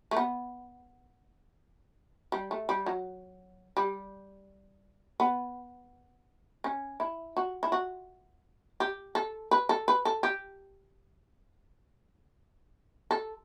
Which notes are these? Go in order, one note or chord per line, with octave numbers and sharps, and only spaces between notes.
A3
B3
G3
A3
G3
F#3
G3
B3
C#4
E4
F#4
E4
F#4
G4
A4
B4
A4
B4
A4
G4
A4